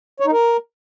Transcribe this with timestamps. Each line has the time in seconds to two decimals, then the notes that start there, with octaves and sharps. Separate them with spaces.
0.20 C#5
0.26 D#4
0.32 A#4